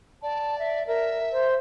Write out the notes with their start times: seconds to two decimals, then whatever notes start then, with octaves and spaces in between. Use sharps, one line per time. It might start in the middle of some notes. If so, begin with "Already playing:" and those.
0.23 D5 A5
0.59 E5
0.87 A#4 E5
1.32 C5